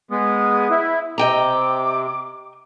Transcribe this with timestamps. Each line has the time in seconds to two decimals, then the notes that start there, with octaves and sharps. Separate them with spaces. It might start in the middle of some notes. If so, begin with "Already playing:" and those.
0.11 G#3 B3 D#6
0.70 E4
1.18 C3 D#5 G5 A#5 D6